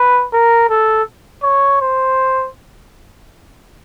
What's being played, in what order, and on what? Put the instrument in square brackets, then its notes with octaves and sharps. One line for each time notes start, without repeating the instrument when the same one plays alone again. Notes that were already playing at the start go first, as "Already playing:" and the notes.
Already playing: [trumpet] B4
A#4
A4
C#5
C5